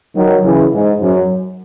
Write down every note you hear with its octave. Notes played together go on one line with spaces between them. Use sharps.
D#3 F#3
C#3 E3
G#2
F#2